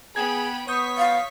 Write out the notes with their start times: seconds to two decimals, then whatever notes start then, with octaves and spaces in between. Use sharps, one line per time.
0.16 B3 G#4 G5 B5 G#6
0.68 B3 C#5 C#6 D#6 G6 B6
0.98 F5